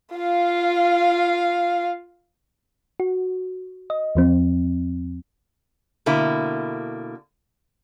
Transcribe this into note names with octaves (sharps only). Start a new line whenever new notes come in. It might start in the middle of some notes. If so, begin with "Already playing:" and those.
F4 F5
F#4
D#5
E2 F3 C4
B2 D3 A#3 E4